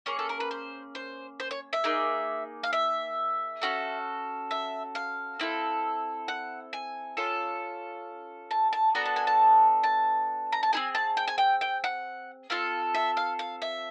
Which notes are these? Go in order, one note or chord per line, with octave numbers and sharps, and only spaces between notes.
A#3 C#4 G#4 C#5
A4
A#4
B4
C5
C5
C5
C#5
E5
A#3 D#4 G#4
F5
E5
C#4 F#4 A4
E5
F5
C4 E4 A4
F#5
G#5
C#4 F4 A4
A5
A5
B3 D4 F#4 A4 A#5
A5
G#5
A5
A5
A#5
A5
C4 E4 G#4 G#5
A5
G5
G#5
G5
G5
F#5
C4 F4 A4 F5
E5
F5
F5
E5